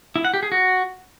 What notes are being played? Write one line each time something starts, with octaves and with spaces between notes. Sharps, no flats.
E4
F#5
G4
G#4
F#4